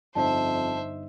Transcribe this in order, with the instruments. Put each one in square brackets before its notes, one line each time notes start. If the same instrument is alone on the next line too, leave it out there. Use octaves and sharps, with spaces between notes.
[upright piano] G1 D#4 D#5 [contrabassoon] F2 [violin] C5 E5 [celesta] A5